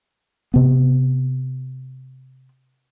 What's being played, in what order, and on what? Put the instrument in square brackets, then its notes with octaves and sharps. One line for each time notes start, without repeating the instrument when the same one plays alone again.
[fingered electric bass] C3 B3